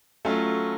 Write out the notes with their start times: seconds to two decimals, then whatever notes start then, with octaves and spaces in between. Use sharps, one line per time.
0.25 F#3 A3 C#4 F4 A4